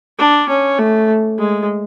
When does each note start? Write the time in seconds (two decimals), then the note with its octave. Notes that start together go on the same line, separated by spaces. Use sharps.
0.19 D4
0.49 C#4
0.78 A3
1.39 G#3